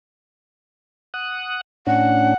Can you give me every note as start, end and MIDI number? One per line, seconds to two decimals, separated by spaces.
1.14 1.61 78
1.14 1.61 87
1.14 1.61 90
1.87 2.34 45
1.87 2.34 61
1.87 2.34 62
1.87 2.37 78